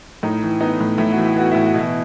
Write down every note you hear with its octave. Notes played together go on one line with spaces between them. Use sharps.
A2 D#4
E3
B3 D#4
A2
A2 E4
E3 F#4
E4
B3 F#4
A2 E4
F#4
B2 E3 E4